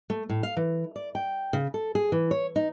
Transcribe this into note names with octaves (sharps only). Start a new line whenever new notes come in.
A3
A2
F5
E3
D5
G5
C#3
A4
G#4
E3
C#5
D#4